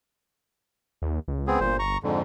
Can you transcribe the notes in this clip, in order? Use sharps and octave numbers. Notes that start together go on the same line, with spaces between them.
D#2
C#2
B3 C4 G#4
G1 A#2 C5
A#5 C#6
F2 G#2 D3